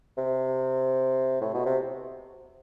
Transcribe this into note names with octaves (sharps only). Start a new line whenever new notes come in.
C3
A2
B2
C3